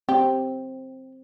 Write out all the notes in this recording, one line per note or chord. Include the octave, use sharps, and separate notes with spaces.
C4 G4